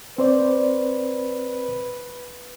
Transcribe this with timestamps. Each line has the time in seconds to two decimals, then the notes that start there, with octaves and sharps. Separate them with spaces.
0.18 C4 B4 C5 D5